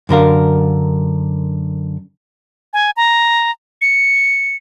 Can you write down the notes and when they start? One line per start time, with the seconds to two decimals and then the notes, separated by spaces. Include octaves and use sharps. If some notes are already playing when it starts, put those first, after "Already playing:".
0.09 F#2 D3 A#4 F5
2.73 G#5
2.97 A#5
3.82 C#7